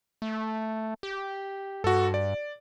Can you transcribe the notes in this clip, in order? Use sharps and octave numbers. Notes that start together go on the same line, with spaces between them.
A3
G4
G2 F#4 A4
D5